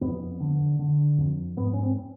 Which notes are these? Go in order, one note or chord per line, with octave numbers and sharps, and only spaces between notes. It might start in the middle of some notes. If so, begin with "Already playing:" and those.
F2 B3
D3
D3
F2
G#2 B3
C#4
C4